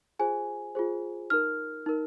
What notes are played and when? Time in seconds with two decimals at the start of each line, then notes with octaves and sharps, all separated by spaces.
0.19 F4 G#4 C5 G#5
0.75 F4 G#4 C5
1.30 D#4 A#4 F6
1.86 D#4 A#4